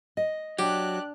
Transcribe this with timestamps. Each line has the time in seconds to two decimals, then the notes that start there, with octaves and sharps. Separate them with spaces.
0.17 D#5
0.59 F#3 D4 G4 F#6